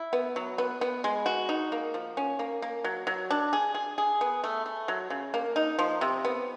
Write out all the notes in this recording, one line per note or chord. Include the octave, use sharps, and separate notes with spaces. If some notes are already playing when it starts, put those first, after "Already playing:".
Already playing: E4
B3
F#3
B3
B3
G#3
F#4
D#4
A#3
F3
C#4
A#3
A#3
F#3
F#3
D4
G#4
G#4
G#4
B3
A3
A3
F#3
C#3
A#3
D#4
F3
C3
B3